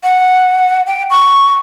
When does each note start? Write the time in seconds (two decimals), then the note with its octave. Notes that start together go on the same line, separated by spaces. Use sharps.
0.03 F#5
0.86 G5
1.10 C#6